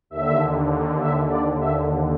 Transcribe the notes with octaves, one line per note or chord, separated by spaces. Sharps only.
D#2 D3 E5
E5
D5
E5